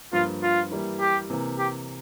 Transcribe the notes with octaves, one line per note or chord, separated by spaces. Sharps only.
G2 F3 A#3 F4
F4
E3 G3 A#3 E4
G4
C3 E3 A#3
G4